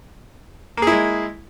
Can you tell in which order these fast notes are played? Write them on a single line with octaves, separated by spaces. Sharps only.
A#3 G#4 E4 G#3